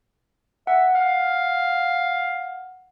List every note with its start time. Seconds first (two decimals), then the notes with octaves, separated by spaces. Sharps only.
0.67 E5 F#5
0.95 F5